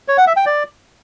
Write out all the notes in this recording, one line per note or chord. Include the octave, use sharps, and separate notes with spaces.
C#5
F#5
E5
G5
D5